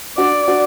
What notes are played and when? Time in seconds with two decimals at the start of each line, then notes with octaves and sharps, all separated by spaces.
0.17 D4 F#4 D5
0.48 D4 F#4